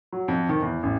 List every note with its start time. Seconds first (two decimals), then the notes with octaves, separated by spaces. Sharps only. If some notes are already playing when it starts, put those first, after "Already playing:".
0.12 F#3
0.28 F2
0.49 D#3
0.62 E2
0.83 A1